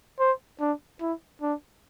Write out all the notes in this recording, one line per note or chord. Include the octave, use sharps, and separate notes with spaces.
C5
D4
E4
D4